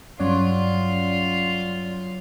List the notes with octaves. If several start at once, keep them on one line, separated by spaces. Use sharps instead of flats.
G2 F#3 C#4 F4 D5